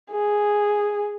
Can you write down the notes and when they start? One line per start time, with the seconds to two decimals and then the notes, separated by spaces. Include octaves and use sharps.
0.11 G#4